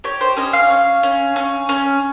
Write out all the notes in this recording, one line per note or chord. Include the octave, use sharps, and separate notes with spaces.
G4 C#5
C5
C#4 D#5
F5
C#4
C#4
C#4
C#4